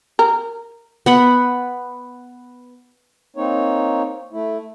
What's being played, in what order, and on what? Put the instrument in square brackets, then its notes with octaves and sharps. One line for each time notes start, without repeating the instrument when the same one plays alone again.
[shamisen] A#4
[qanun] B3 F#5 B5
[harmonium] A#3 C4 D#4 C#5
A3 E4